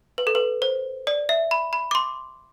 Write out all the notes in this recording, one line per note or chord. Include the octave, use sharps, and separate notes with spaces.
B4
A4
B4
C5
D5
E5
B5
B5
D6
C6